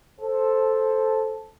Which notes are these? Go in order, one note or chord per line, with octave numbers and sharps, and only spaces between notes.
A4 C5